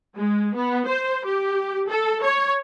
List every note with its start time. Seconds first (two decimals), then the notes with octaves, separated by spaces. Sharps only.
0.15 G#3
0.55 B3
0.87 C5
1.25 G4
1.89 A4
2.22 C#5